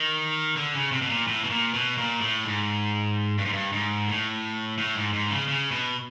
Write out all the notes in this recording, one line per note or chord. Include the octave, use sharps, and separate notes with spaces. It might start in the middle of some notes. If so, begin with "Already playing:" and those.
Already playing: D#3
D3
C#3
C3
B2
A#2
A2
B2
A#2
B2
A#2
A2
G#2
G2
G#2
G2
G#2
A2
A2
G#2
G#2
C#3
C#3
B2